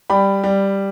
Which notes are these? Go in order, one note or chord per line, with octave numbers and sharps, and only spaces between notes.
G3 G5 B5
G3